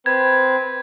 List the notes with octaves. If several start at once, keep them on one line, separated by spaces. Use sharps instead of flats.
C4 B4 G#6